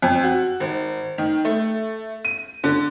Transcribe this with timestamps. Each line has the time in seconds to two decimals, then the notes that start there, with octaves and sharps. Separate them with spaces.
0.02 F2
0.23 F#4
0.60 G#1
1.18 D#3
1.45 A3
2.25 D#7
2.64 D3